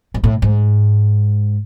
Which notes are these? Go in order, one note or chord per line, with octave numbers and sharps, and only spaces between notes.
G#2
A2
G#2